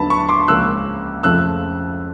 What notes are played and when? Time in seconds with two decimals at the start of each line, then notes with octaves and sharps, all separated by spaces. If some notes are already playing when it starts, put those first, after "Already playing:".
Already playing: D#2 D3 F#3 B3 D4 A5 B5
0.10 B5 C#6
0.29 C6 D6
0.48 C#2 C#3 F3 A#3 C#4 E6 F#6
1.23 F2 C#3 F3 A3 E6 F#6